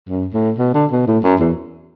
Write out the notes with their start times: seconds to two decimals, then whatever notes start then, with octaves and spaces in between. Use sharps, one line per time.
0.09 F#2
0.34 A2
0.58 B2
0.74 D3
0.91 B2
1.07 A2
1.24 F#2
1.40 E2